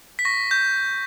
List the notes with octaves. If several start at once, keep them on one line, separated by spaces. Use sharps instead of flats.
B6
C#6 A#6
G6